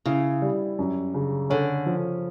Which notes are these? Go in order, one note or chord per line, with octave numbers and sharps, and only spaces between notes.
C#3 E4
G3
F#2
C#3
D3 C#4
F3